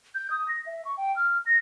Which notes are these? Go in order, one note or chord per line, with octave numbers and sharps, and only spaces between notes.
G6
D#6
A#6
E5
C#6
G5
F6
A#6